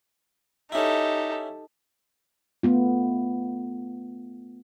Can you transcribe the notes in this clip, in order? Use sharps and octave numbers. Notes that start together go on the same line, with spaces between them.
C#4 D#4 E4 G4 A4
A3 B3 F4